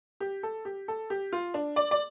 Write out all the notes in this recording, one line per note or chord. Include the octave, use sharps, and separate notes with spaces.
G4
A4
G4
A4
G4
F4
D4
D5
D5